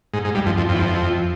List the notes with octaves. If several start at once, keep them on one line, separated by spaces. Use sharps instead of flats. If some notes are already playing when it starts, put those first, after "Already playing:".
G#2
G#2
G2
F2
F2
F2
E2
F2